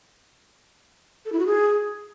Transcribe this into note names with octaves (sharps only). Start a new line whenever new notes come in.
A4
E4
F#4
G#4